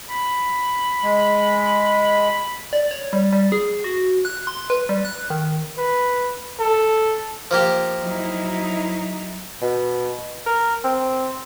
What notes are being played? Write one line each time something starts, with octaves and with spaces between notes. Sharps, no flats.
B5
G#3
D5
C#5
G3
G3
G#4
F#4
F#6
C6
B4
G3
F#6
D#3
B4
A4
F3 A#3 G4
F#3 D#4 E4
B2
A#4
C4